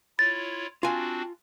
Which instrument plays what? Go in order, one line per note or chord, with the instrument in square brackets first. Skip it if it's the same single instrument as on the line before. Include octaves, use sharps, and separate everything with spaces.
[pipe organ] E4 F4 C#5 [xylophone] A6
[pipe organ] C4 D4 F#4 [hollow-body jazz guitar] F4 G#5